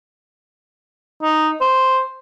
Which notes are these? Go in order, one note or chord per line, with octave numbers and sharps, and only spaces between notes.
D#4
C5